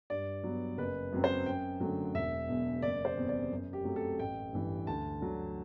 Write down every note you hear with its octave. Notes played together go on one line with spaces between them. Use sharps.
G2 D5
F#3 B3
F#1 B4
F#2 F#3 C4
C5
F#2 G5
D3 F#3 A3
E1 E5
E2 B2
F#1 D5
C5
E2 C3
D5
F#2
G4
F#3 A3 C4
A4
A1 G5
G2 E3 G3
D2 A5
D3 F#3